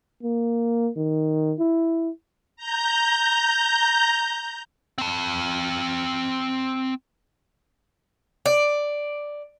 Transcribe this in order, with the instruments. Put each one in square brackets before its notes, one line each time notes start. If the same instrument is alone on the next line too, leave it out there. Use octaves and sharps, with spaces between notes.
[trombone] A#3
D#3
E4
[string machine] A#5 G6
[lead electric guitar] C4 A5
[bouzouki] D5